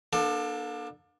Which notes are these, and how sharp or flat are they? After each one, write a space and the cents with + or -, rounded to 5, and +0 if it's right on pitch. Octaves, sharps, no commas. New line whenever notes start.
A#3 +40 D4 +25 A4 +0